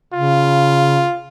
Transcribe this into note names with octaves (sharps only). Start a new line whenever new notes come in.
C#3 F4